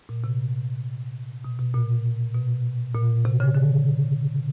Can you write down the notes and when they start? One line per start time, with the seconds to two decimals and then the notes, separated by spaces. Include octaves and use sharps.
0.09 A#2
0.24 C3
1.45 B2
1.59 B2
1.74 A#2
2.35 B2
2.95 A#2
3.25 C3
3.40 C#3
3.55 D3